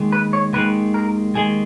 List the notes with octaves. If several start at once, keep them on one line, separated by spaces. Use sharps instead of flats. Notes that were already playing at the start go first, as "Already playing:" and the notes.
Already playing: D#2 D#3 G#3
B4
C#5
D#2 D#3 G#3 B4
A#4
D#2 D#3 G#3 G#4